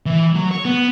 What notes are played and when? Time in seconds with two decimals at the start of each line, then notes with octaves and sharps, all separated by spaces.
0.06 E3
0.36 F#3
0.51 C#5
0.65 B3